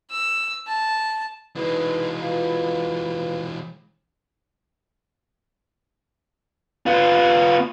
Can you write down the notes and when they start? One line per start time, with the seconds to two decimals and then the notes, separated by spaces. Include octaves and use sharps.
0.10 E6
0.67 A5
1.56 E3 G#3 D#4 B4
2.22 F4 B4 F5
6.86 B3 F4